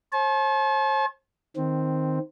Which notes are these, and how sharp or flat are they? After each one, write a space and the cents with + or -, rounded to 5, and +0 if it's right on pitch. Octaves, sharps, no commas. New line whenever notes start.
C5 +45 A5 -40
D#3 +0 C4 +0